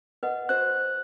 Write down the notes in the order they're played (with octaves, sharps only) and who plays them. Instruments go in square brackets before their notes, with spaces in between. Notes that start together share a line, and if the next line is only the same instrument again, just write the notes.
[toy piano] B4 D#5 F#5
[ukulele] F#4 C5 [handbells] F#6